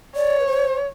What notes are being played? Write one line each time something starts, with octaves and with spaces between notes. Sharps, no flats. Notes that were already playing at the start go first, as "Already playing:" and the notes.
C#5 D5
B4
C5